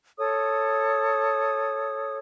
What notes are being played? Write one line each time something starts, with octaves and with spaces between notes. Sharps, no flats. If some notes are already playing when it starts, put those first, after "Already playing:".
A4 C#5 D#6